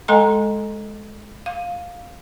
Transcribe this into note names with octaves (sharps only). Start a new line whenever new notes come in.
G#3 A4 D#5 G#5 A#5 C6
F5